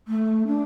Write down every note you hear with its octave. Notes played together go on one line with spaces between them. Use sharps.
A3
D4